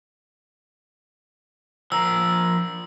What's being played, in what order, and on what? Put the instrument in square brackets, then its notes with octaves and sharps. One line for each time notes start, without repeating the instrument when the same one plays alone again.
[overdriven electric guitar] F3 A#4 [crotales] E6